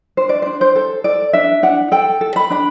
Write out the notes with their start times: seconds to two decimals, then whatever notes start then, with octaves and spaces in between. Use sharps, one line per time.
0.17 D4 C5
0.29 D5
0.42 D4 C5
0.61 C5
0.76 A4
1.04 A4 D5
1.33 D4 E5
1.63 D4 F#5
1.91 A4 G5
2.21 A4
2.36 B5
2.50 D4 B5